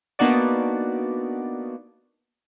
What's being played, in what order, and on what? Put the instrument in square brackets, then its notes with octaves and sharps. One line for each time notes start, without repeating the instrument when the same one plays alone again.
[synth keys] A#3 B3 D4 D#4 F#4 D5